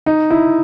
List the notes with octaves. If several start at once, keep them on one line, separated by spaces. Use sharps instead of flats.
D#4
E4